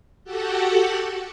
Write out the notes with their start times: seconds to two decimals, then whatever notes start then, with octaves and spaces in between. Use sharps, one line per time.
0.25 F#4 G4 A4 F#5